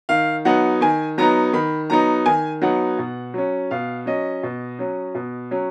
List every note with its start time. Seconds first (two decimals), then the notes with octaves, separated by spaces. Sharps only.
0.09 D#3 F5
0.45 F#3 B3 D#4 F#5
0.81 D#3 G#5
1.18 F#3 B3 D#4 A#5
1.53 D#3 B5
1.90 F#3 B3 D#4 A#5
2.26 D#3 G#5
2.62 F#3 B3 D#4 F#5
2.99 B2
3.34 F#3 C#4
3.71 B2 F5
4.06 F#3 C#4 D#5
4.43 B2
4.79 F#3 C#4
5.15 B2
5.51 F#3 C#4